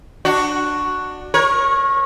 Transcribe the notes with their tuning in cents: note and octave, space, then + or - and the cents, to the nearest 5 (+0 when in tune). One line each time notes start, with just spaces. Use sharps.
D4 +10 F#4 +0
A#4 +25 C#5 -20